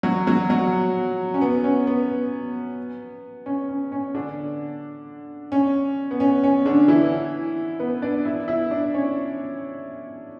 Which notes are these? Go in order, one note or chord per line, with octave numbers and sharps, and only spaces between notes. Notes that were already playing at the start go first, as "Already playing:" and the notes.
F#3 F#4
F#3 F#4
F#3 F#4
C#4
B3
C#4
B3
C#4
C#4
C#4
D3 D4
C#4
B3
C#4
C#4
D3 D4
E3 E4
B3 B4
D4 D5
E4 E5
E4 E5
D4 D5
C#4 C#5